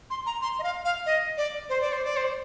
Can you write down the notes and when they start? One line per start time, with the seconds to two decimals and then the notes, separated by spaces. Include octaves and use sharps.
0.10 C6
0.26 A#5
0.42 C6
0.59 D#5
0.63 F5
0.85 F5
1.06 D#5
1.37 D5
1.69 C5
1.81 D5
1.93 C5
2.04 D5
2.17 C5